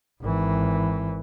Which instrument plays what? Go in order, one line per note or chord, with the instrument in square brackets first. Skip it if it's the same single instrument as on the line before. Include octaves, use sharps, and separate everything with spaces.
[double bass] G#1 E3